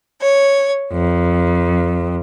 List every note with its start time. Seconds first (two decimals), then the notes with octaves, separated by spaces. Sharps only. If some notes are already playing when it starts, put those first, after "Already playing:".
0.20 C#5
0.91 F2